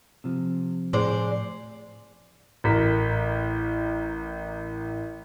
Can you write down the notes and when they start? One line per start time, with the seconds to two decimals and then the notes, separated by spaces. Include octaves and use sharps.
0.24 C3 F3
0.93 A2 G#3 C5 D5
2.64 A1 A#4 A#5 B6